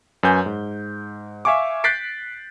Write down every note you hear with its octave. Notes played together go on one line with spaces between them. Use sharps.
F#2 F#4 B4 G#5 G6
G#2
E5 F5 G#5 C#6 D6
F#6 G6 A6 B6 C7 D7